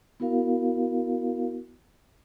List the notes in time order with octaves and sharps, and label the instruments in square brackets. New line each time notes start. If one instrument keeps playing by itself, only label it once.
[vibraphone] B3 E4 F#4 A#4 F5